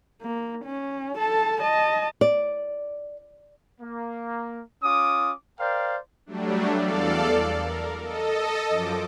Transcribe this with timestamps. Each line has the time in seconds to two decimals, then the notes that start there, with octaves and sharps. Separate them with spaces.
0.22 A#3
0.65 C#4
1.17 A4 A5
1.61 D#5 A5
2.21 D5
3.81 A#3
4.83 C#4 F4 D6 D#6
5.59 A#4 C5 D5 F5 G5
6.26 F#3 G3 A3 D4
6.73 E2 A4 D5 F5
7.58 A#4
8.02 A4 D#5
8.69 F#2 F3 D6